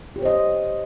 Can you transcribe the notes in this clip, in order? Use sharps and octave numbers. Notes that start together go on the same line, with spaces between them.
G4 C5 C#5 D#5